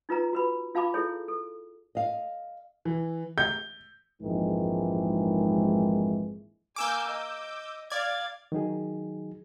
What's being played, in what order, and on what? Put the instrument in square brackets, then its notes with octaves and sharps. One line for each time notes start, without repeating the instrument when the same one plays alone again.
[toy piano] D#4 F4 B4 A#5
F#4 B4 B5
F4 F5 A5 B5 D6
E4 G#4 A4 C#5
A4
[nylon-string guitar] D#5 F5
[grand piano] E3
[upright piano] G6
[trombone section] A#1 F2 G#2 D#3 E3 G#3
[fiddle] A#3 G#5 [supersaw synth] D6 E6 G6
[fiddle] D#5
[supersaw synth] D5 G#6 [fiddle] F5
[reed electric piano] D#3 F#3 D#4 G#4